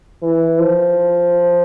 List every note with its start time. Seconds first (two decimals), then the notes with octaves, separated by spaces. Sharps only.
0.22 E3
0.59 F3